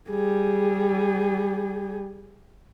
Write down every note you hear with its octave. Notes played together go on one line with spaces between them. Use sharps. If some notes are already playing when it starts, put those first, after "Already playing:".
G3 G#4